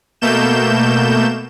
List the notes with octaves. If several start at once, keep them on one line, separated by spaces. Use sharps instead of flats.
B2 A3 A#3 G6 E7